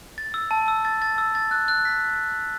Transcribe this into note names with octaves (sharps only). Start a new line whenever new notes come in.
A6
E6
A5
E6
A6
A6
E6
A6
F#6
F#6
B6